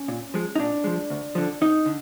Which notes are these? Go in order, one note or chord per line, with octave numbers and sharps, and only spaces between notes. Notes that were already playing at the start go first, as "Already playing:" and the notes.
Already playing: C#4
A#2
F3 G#3
D#4
A#2 D4
F3 G#3
D2
D3 F3
D2 D#4
D3